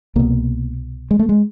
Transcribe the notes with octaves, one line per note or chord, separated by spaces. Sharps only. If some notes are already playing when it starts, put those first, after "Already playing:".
C2 B2 A#3
G#3
A3
G#3